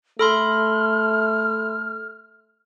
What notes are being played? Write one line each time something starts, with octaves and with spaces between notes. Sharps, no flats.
A3 A4 B5 C6 F6